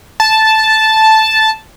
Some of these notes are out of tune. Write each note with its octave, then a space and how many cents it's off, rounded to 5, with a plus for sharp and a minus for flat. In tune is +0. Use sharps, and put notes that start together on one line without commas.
A5 -5